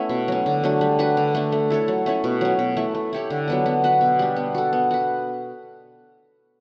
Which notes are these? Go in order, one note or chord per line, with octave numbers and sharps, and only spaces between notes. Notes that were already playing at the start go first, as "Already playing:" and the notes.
Already playing: A3 B3 C#4 E4
B2
F#3 C#4
D3
F#3 A3 D4
G3
D4 F#4 B4
D3
A3 D4
A3
E4 A4 C#5
F#3
A3 C#4 E4
B2
F#3 C#4
B2
A3 E4
A3
E4 G4 C#5
D3
F#3 B3 D4
B3
F#4 B4
B2
G3 D4
B3
F#4 A4
B3
F#4 B4